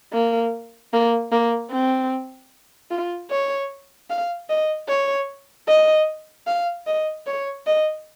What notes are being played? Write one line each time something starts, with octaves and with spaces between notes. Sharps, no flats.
A#3
A#3
A#3
C4
F4
C#5
F5
D#5
C#5
D#5
F5
D#5
C#5
D#5